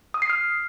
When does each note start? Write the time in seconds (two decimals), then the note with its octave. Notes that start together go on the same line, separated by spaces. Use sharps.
0.14 D#6
0.22 C7
0.30 F6